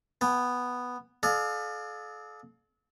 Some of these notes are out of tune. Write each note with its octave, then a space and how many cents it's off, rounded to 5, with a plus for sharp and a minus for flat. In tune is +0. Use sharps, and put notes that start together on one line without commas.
B3 +0 G#5 -45
A4 -40 D5 +35 F5 +25